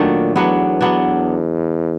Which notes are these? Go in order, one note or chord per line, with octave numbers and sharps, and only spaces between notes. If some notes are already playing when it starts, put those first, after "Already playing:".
Already playing: A#2 D#3 F#3 A3 D4
E2 F#3 B3 D4
F#3 B3 D4